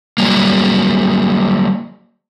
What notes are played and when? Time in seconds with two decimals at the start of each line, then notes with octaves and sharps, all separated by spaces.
0.18 F#3 G3 A#3